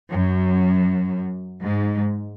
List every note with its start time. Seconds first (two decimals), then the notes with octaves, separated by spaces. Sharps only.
0.10 F#2
1.62 G#2